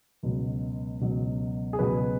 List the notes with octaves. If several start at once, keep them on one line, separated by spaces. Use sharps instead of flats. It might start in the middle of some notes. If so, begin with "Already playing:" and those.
C#2 B2 F#3
C#2 B2 F#3
G#4
C#2 B2 F#3 B4